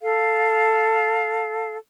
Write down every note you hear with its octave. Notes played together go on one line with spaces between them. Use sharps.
A4 F5